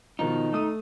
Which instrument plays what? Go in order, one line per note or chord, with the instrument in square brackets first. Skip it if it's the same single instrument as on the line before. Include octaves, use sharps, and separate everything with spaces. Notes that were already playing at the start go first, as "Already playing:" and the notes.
[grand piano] B2 D#3 F3 [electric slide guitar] D#4
[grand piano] A3 D#6 D#7